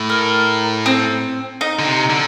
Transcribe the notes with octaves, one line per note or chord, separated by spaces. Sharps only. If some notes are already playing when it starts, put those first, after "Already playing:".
Already playing: A2
A#4
C4
D#4
D3
C3
D3